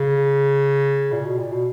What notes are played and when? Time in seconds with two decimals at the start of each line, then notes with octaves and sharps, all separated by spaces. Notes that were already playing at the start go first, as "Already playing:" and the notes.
Already playing: C#3
1.12 A#2
1.25 B2
1.38 A#2
1.52 B2